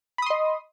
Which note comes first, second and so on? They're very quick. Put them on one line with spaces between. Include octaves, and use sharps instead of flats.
B5 D#6 C6 D#5